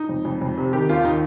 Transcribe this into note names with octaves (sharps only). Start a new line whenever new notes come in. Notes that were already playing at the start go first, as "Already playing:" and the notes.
Already playing: D#4
F2
F2
F2
C3
D#3 G4
D#2 F4
D#3 D#4